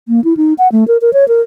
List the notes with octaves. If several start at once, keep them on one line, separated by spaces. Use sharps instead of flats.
A#3
E4
D#4
F#5
A3
A#4
A#4
C#5
A#4